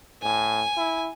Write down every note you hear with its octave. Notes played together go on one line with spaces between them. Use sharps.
A2 G#5
E4